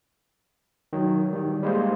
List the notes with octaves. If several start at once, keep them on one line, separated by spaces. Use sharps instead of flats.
D#3 F#3
D#3 G3
G3 G#3 A#3 C5